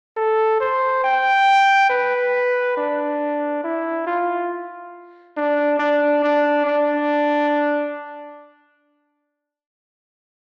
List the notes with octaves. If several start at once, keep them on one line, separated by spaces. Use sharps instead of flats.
A4
C5
G5
B4
D4
E4
F4
D4
D4
D4
D4